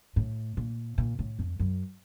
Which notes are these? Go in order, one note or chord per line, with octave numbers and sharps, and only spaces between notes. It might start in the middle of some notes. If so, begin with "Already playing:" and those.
A2
A#2
A#2
A2
F2
F#2